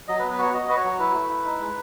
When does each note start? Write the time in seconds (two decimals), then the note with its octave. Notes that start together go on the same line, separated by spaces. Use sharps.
0.08 F#3 D#5
0.19 B4
0.23 B3
0.31 B4
0.39 F#4 C#5
0.54 F#4 D#5
0.69 F#4 B4
0.77 C#5
0.84 F#3
0.99 E4 B4
1.14 A3
1.29 E4
1.45 D#4
1.60 G#3